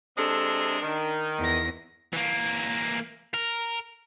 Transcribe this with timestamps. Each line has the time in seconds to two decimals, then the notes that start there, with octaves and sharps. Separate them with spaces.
0.18 C3 G#3 D4 A4
0.82 D#3
1.39 E2 A#6
2.13 E3 A#3
3.34 A#4